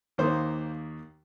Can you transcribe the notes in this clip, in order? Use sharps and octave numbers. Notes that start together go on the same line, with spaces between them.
D#2 D#3 A#3 C5